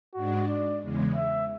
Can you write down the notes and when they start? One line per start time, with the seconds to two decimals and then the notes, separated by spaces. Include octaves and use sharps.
0.14 G#2 G#3 D4 F#4
0.48 D5
0.81 E2 C#3 G#3
1.15 E5